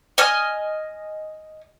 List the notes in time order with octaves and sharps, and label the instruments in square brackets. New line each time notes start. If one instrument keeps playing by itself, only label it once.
[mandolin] D#5 G#5 F6